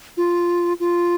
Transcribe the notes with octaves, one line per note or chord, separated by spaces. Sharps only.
F4
F4